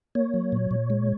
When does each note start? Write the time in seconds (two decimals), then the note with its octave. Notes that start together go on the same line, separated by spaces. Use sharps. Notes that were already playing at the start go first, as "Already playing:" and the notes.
0.15 A#3 C#5
0.34 F#3
0.52 A#2
0.71 A#2
0.90 G#3